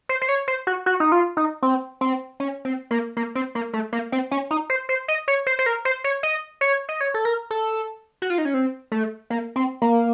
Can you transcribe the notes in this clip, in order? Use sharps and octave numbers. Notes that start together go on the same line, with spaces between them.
C5
C5
C#5
C5
F#4
F#4
D#4
F4
D#4
C4
C4
C#4
C4
A#3
A#3
C4
A#3
A3
A#3
C4
C#4
D#4
C5
C5
D#5
C#5
C5
C5
A#4
C5
C#5
D#5
C#5
D#5
C#5
A4
A#4
A4
F#4
F4
D#4
C#4
C4
A3
A#3
C4
A#3